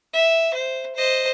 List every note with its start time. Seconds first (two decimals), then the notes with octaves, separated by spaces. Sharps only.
0.13 E5
0.54 C5
0.96 C5 D#5